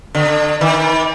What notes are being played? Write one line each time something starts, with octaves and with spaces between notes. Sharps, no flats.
D3
D#3